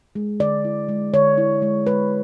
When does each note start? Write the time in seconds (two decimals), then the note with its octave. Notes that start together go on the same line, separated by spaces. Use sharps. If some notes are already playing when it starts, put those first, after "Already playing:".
0.15 G#3
0.40 D3 D5
0.65 E4
0.89 G#3
1.14 D3 C#5
1.38 E4
1.62 G#3
1.87 G#3 B4